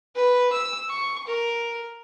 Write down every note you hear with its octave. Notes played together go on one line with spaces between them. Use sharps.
B4
E6
C#6
A#4